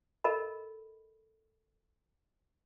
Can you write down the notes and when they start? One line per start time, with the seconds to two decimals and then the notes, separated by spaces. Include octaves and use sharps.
0.24 A4 A#4 D#5 B5